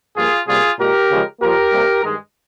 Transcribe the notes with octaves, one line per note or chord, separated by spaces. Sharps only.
G2 F3 A#3 F4 G#4
C3 G3 A#3 F4 G#4
A#2 G#3 G4 A#4
C#3 F3 G#3
A#2 F3 A#3 G4 A#4
C3 G3 A#3
G2 D#3 G#3